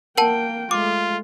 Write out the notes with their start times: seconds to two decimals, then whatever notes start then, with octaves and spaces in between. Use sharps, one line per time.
0.18 A#3 A#4 F#5 G5 A5
0.71 G#3 A3 F4 D6